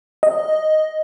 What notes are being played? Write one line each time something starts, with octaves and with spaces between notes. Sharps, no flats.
D#5